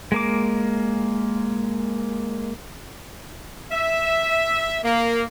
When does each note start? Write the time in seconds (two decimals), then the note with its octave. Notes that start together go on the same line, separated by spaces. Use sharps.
0.12 G#3 A#3 D6
3.72 E5
4.84 A#3